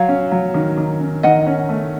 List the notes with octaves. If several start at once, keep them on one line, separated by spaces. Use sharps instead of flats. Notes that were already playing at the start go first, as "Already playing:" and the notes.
Already playing: F#3 C#5 F5
C#4
F#3
D#3
D#3
C#4
D#3 D#5 F#5
C#4
A3